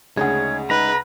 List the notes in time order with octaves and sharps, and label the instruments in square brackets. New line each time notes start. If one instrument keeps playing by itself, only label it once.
[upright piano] D2 C#3 [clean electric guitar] G#3 D#4 G#4 [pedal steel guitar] C#5
[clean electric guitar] G#3 D#4 [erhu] B4 [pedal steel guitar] A#5